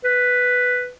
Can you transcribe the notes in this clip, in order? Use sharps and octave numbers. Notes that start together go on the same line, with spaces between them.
B4